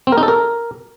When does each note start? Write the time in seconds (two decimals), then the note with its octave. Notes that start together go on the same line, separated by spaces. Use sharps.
0.07 C4
0.12 A#4
0.18 D#4
0.23 A4
0.28 A#4